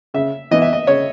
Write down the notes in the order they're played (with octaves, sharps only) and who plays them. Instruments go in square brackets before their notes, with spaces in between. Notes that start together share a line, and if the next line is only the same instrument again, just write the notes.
[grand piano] C#3 [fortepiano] E5
[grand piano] E3 B3 E4 [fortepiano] D#5
[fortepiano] E5
D#5
[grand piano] C#3 [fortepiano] C#5